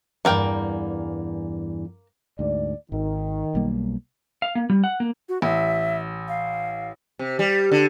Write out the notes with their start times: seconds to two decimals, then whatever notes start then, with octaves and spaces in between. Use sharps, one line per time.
0.25 E2 G2 E3 A#3 A#4 G5
2.39 D2 G#2 D5
2.92 G#1 D#3
3.55 B1 G3 A#3
4.42 F5
4.55 A#3
4.70 G3
4.84 F#5
5.00 A#3
5.29 F#4
5.42 A1 E5
6.28 F5
7.19 C3
7.39 G3
7.72 D3